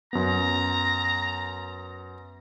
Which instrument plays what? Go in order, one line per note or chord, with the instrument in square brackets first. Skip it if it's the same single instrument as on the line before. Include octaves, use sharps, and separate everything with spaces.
[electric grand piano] F#2 B3 [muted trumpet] A#5